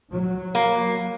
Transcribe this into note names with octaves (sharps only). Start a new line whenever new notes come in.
F#3
A#3